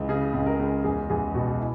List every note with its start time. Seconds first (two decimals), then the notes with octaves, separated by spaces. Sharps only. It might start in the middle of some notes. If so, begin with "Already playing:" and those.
Already playing: C#2 E3
0.09 C#3 G#4
0.34 C#2
0.46 A#4
0.60 C#2
0.84 E2 G#4
1.10 E2 G#4
1.35 B2 F#4
1.60 E4